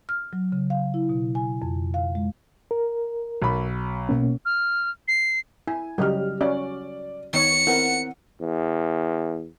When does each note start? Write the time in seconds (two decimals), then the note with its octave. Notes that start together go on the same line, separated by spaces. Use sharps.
0.09 F6
0.33 F#3
0.52 C#3
0.70 F5
0.94 E4
1.09 B2
1.35 G#5
1.62 F2
1.94 F5
2.15 G#3
2.71 A#4
3.42 B1 B5
4.09 B2 A#3 C#4
4.45 F6
5.08 C7
5.67 E4 G#5
5.98 C#3 F#3 G3 G4 D#5 F6
6.41 C#4 F#4 D5
7.33 D#3 B3 C#5 C#7
7.67 C4 E4 A#4 F#5
8.41 E2